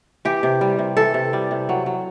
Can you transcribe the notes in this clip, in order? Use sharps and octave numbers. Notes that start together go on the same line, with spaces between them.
E3 G4
C3
G3
C3
E3 A4
C3
G3
C3
F#3
F#3